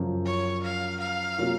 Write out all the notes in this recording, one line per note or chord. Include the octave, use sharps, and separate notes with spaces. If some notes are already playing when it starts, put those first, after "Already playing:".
Already playing: F#2 C#3 F3
C#5
F5
F5
C3 F#3 A#3 C#4 F4